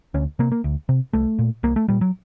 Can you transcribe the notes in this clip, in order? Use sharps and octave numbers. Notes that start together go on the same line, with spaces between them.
D2 C#4
C3 A#3
A#3
D2
C3
C2 A3
A#2
C2 A#3
A3
A#2 G3
F#3